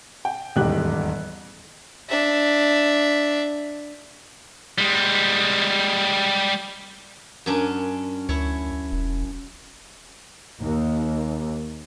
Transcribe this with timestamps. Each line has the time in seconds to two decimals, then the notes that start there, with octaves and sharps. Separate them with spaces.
0.25 G5
0.56 D#1 E2 G#2 G#3 G4 F#6
2.09 D4 E5
4.78 G3 G#3
7.46 F#2 C#4 D4
8.29 D2 E4 C#5
8.92 E1
10.60 D#2